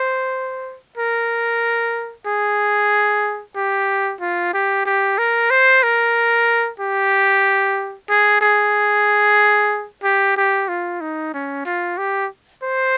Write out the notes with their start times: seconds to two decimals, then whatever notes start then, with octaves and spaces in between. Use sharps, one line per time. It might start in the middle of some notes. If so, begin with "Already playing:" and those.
Already playing: C5
0.97 A#4
2.26 G#4
3.56 G4
4.21 F4
4.54 G4
4.86 G4
5.18 A#4
5.50 C5
5.83 A#4
6.80 G4
8.09 G#4
8.41 G#4
10.04 G4
10.37 G4
10.68 F4
11.01 D#4
11.34 C#4
11.65 F4
11.98 G4
12.63 C5